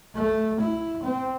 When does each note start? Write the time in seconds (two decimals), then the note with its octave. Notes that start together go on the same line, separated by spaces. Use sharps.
0.15 A3
0.60 E4
1.03 C4